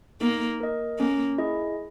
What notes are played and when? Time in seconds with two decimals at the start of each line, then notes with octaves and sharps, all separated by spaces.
0.21 A#3 D#4
0.60 A#4 D#5
0.99 A#3 C#4
1.38 E4 G#4 D#5